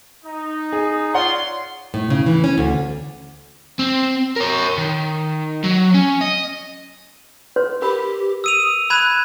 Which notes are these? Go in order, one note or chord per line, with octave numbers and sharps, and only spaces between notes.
D#4
G#4
F4 C#5 D5 F#5 C6
A2
C#3
E3
C#4
D2
C4
A#4 C#5
D#3
F#3
C#4
D#5
B4 C#5 C6
G4 A#4 B5
D#6 E6 D#7 F7
B5 F#6 G#6 E7